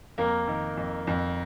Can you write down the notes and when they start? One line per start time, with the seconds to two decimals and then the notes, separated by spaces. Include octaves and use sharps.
0.18 F2 A#3 A#4
0.48 D#3
0.77 F2
1.07 F2